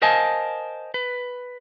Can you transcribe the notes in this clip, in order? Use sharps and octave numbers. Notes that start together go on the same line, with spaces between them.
A#4 C5 D#5 F5 G#5 A5
B4